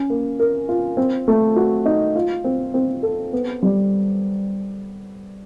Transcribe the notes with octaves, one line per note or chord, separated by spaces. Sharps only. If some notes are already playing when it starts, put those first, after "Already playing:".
Already playing: C#4
A#3
A#4
F4
C4
A3
F#4
D#4
F4
C4
C4
A4
B3
G3